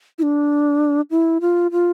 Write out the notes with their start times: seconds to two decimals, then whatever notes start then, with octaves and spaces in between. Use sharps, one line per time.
0.19 E4
0.23 D4
1.11 E4
1.41 F4
1.72 F4